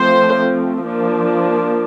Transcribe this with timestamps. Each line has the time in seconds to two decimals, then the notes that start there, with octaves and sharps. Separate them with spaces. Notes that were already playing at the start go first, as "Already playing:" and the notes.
Already playing: F3 A3 C4 C5
0.84 F3 A#3 D4